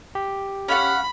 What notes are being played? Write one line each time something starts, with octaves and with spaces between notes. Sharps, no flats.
G4
C#4 F5 F#5 B5